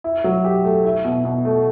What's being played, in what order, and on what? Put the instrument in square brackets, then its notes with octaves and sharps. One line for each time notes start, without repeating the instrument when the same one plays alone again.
[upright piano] E4
F#3
G4
A3
E4
B2
B2
A3